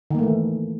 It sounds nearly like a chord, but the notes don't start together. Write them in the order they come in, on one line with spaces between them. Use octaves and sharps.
D#3 A#3 A3 E3